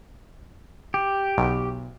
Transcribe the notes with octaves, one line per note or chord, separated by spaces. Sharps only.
G4
B1